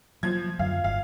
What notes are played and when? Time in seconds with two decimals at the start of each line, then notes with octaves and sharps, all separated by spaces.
0.23 F3 F#3 A#3 G#6
0.59 F#2 D3 F#3 F5
0.84 G1 F5